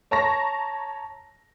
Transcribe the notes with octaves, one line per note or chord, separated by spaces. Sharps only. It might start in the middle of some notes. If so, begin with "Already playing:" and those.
C#5 A5 A#5 C#6 A#6